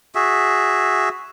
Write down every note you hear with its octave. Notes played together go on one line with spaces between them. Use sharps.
F#4 G#4 E5